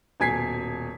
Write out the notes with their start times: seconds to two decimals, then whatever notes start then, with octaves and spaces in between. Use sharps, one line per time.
0.20 D#1 B2 G#5 G#6 B6 C7